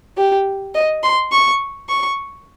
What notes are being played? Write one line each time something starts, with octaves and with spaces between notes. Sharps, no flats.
G4
D#5
C6
C#6
C#6